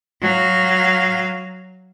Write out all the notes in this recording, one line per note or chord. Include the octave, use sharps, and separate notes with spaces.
F#3 F5